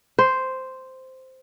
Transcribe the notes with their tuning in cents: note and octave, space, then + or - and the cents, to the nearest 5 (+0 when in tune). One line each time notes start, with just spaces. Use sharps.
C5 -5